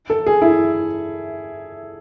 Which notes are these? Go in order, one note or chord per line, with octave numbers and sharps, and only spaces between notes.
A4
G#4
E4